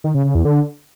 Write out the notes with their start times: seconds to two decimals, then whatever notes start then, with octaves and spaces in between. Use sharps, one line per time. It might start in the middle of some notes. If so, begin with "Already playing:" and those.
0.04 D#3
0.14 C#3
0.25 C#3
0.35 E2
0.45 D3